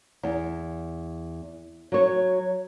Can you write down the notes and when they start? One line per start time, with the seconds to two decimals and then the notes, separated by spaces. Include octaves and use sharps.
0.23 E2
1.92 F#3 C#5